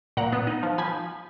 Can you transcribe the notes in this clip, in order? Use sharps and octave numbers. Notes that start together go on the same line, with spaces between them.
A#2 F#5 A#5
B3
D#4
F3
F3 G#5 B5